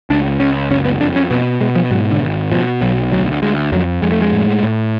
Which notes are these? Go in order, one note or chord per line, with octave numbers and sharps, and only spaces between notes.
C#2 D4
C#2 C#4
F#1 C#4
B3
F2 D4
C#4
B2 B3
B2 G#3
F3
G#2 F#3
D3
G#1
B2 F3
B1 F#3
D2 F#3
D2 G#3
F2 F#3
F2 G#3
A3
G#3
A2
A2